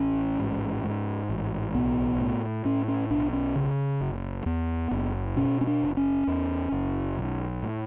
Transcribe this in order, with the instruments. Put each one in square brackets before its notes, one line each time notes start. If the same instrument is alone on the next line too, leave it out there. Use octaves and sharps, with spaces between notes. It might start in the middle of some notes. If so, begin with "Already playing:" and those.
Already playing: [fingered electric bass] A1 C#4
G#2
G#2
A1
B1 B3
A2
A2 C#4
C#4
B1 D4
C#4
C#3
F#1
E2 B3
F#1
B2 C#4
C#4
D4
F#1
C#4
E2
F#1
B1
A2